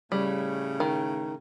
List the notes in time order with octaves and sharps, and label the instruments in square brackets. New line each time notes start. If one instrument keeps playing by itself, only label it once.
[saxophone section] A2 C#3 [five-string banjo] G3
[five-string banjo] D#3